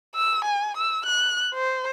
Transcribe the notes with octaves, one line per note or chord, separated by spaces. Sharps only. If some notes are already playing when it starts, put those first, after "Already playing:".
E6
G#5
E6
F#6
C5